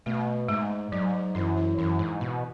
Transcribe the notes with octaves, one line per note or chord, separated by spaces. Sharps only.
B2 A3
G#2 G#3
G#2 F#3
F#3
F#2 E3 E4
E3 E4
F#2 E3 E4
G#2
B2